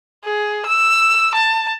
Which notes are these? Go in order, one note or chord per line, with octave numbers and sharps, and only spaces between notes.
G#4
E6
A5